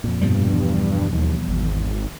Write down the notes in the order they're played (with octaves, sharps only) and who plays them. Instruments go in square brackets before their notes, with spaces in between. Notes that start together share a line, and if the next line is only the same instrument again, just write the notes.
[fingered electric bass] F2 A#2
[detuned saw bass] G2 [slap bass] B2 F3 G3
[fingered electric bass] E2
[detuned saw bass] D#2
G#1